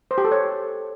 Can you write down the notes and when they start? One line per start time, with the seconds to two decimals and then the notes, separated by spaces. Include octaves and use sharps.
0.11 C5
0.18 G4
0.25 A4
0.32 C#5